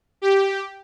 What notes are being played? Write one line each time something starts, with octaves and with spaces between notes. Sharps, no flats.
G4